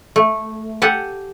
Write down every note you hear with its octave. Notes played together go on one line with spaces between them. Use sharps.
A3
G4 A4 F#5 G#5